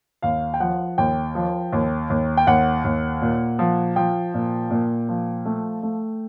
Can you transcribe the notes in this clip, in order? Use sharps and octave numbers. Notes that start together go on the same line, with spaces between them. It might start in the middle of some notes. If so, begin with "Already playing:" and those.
D#2 F5
G5
F3 F#5
D#2 G5
F3
D#2
D#2
G5
D#2 F#5
D#2
A#2
F3
F3 G5
A#2
A#2
F3
A3
A3